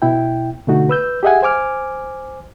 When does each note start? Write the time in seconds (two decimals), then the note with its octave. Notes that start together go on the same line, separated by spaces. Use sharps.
0.02 B2 E4 G5
0.68 B2 D3 A3 D#4 F#4
0.89 B4 E6 G6
1.23 G4 G#4 D#5 E5 F#5 G#5
1.42 C5 G#5 D6 F6